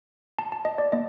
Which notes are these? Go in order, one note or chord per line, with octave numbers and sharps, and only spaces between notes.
A5
A5
D#5
D5
A#3 D#5